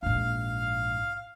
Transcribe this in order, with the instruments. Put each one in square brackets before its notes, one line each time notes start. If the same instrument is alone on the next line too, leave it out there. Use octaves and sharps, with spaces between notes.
[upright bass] A#1 G#2 [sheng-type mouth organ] F5